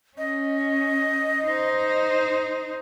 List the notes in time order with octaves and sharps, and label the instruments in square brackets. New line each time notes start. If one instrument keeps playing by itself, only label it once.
[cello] C#4 [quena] D#5
[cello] D#4 C5